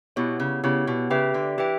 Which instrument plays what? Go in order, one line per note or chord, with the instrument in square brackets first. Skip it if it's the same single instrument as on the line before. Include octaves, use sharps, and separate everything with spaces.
[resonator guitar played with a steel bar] B2 [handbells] B3 E4 G4 C#5
[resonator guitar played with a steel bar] C#3
[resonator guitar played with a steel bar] C#3 [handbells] B3 E4 G4 C#5
[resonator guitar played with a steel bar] B2
[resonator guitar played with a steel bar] C#3 [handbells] G4 B4 E5 G5
[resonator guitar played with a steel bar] D3
[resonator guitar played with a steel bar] E3 [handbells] G4 B4 E5 G5